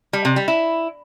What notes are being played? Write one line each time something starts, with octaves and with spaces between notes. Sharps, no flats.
G3
C3
G3
E4